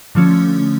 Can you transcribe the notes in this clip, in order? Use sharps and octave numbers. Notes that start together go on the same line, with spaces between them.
D3 F3 A3 C#4